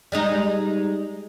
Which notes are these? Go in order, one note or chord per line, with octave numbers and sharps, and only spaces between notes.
G3 G#3 D#4